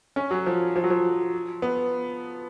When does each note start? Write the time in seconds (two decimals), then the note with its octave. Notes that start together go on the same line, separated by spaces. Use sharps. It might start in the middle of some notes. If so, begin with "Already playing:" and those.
0.16 C#4
0.31 F#3
0.46 F3
0.76 F3
0.84 F#3
0.90 F3
1.62 B3